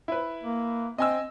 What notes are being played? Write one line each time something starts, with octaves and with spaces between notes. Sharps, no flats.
E4 B4
A#3
C4 D#5 G#5 E6